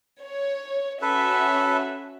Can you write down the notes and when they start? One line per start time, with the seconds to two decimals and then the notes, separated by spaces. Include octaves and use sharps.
0.22 C#5
1.02 C#4 F#4 A4 B4 E5